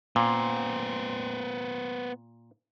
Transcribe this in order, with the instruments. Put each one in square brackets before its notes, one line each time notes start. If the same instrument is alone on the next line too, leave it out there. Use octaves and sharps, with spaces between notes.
[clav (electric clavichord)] A#2 [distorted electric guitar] B3 C5